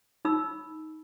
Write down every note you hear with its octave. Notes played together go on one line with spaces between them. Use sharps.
D#4 B5 E6